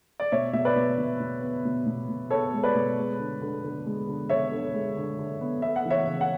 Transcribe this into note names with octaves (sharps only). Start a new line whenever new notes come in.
D5
B2 C#5 E5
B2 E5
B4 D5
B2
B2
B2
B3
B2
B2
B2
B3 A4 C#5
G#3
B4 D5
B2
G#3
D3
D3
D3
G#3
D3
B3 C#5 E5
D3
G#3
D3
D3
B3
B3 E5
F#5
E3
C#5 E5
C#3
F#5